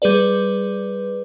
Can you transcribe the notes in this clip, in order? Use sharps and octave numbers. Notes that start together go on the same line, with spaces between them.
G3 G#4 B4 D5